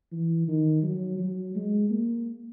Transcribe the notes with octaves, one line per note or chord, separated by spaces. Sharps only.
E3
D#3
F#3
F#3
G#3
A#3